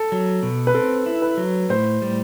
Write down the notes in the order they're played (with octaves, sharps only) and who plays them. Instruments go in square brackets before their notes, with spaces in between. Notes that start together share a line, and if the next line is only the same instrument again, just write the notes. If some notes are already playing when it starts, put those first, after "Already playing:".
Already playing: [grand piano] A4
[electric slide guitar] F#3
B2
[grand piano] B4
[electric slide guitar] C4 [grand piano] A4
[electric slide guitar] E4
[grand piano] B4
[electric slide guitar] F#3
[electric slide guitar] A2 [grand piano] C5
[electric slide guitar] G3